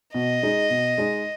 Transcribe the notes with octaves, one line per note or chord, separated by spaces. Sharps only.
B2 D#5
G#3 D#4 G#4
B2
G#3 D#4 G#4